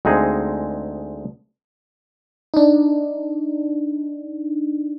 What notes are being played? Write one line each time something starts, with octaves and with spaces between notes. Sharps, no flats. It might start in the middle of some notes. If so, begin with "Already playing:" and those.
D2 G#3 C4 D#4 G#4
D4 D#4